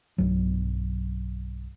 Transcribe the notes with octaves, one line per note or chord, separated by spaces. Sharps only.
B1 G2 F#3